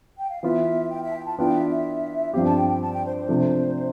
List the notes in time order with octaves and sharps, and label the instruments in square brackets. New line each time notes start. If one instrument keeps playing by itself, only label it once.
[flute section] G5
F5
[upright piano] E3 B3 F4 [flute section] E5
[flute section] G5
E5
A5
G5
A5
[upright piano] E3 B3 D4 F4 [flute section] G5
[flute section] F5
E5
E5
[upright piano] G2 F3 C4 G4 [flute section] F5
[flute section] A5
G5
G5
A5
G5
C5
C5
[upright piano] C3 F3 A3 D4